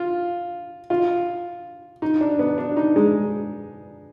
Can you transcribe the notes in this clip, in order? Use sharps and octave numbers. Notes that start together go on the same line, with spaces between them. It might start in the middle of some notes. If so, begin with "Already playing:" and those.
Already playing: F4
F4
D#4
D4
B3
D4
D#4
G#3